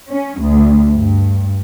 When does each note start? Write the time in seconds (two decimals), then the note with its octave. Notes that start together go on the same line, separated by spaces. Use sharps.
0.11 C#4
0.41 D2
0.96 G2